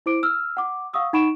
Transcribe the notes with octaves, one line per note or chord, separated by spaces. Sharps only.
E4 C5 D6 D7
E6 F6
F#5 D6
F5 F#5 C#6 D#6 E6
D#4 F#5 B5 C#6 D7 E7